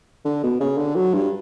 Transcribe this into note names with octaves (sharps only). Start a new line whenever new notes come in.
D3
B2
C#3
D3
F#3
G2